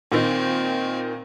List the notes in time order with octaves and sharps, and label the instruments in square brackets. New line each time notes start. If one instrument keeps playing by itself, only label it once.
[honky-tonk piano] A#2 D#3 [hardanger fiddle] C4